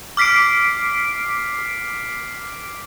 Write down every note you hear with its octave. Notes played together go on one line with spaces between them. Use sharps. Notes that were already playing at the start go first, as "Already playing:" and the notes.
D6 F6 B6 C7 D7